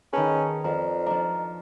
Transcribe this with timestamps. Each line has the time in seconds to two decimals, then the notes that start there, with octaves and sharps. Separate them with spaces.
0.13 D#3 C#4 D#4 G#4 B4 A5
0.64 F2 F3 D5 A#5
1.06 F3 D4 D#5 A#5